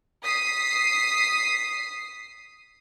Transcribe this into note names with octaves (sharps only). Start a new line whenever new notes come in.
D#6 B6 C7